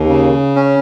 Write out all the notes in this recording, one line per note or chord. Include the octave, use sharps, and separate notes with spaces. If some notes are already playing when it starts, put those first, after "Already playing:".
Already playing: D#2
C#3
C#4